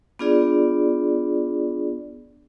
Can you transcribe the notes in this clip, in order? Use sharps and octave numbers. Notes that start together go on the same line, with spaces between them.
B3 D4 F4 G#4 D5